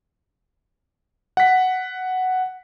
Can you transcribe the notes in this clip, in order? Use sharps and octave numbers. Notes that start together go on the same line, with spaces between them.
F#5 B6